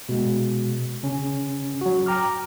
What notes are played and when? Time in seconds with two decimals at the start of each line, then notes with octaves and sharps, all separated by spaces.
0.09 B2 G#3
1.03 C#3 C#4
1.81 F#3 F#4
2.06 G5 A#5 D6 F6